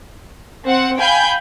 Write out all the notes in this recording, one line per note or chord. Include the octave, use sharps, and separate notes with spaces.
C4 F#5
F5 G5 G#5 B5 G6